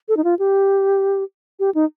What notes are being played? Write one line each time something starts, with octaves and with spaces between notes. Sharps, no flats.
A4
D#4
F4
G4
G4
D#4